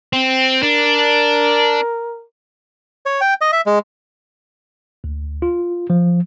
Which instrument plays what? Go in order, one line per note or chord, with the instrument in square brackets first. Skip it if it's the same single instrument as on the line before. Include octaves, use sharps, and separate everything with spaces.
[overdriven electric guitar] C4
[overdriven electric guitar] D4 [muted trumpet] A#4
[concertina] C#5
G5
D#5
E5
G#3
[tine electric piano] D2
F4
F3